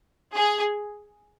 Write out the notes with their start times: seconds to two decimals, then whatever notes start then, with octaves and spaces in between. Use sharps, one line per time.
0.34 G#4